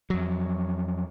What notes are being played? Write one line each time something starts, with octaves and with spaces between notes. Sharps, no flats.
F2 F#3